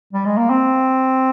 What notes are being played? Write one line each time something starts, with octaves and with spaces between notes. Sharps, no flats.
G3
G#3
A#3
C4